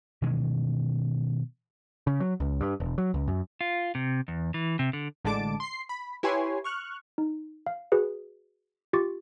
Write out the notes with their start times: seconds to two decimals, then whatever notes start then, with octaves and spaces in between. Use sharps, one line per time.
0.22 B2 D#3 E3 G#3
2.07 C#3
2.20 F#3
2.40 C#2
2.61 G2
2.80 E1
2.98 F#3
3.14 C#2
3.28 F#2
3.61 F4
3.95 C3
4.28 E2
4.54 E3
4.79 C3
4.93 D3
5.25 A1 D3 G#3 A5 D6 D7
5.60 C6 C7
5.89 B5
6.23 E4 G4 B4 C#5 G#5 C6
6.64 C#6 F6 F#6
7.18 D#4
7.66 F5
7.92 F#4 G#4 B4
8.93 F4 G4 C#6 D6 A6